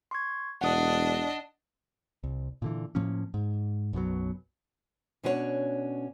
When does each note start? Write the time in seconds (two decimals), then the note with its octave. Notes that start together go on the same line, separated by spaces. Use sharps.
0.11 C6 C#6 G#6
0.61 E1 D4 D#5 F#5 D#6
2.24 C2
2.62 A#2 D3 E3
2.95 A2 F3 A#3 C#4
3.34 G#2
3.93 B1 F#2 B2 F#3
5.23 B2 C#4 D4 F#4 B4 C#5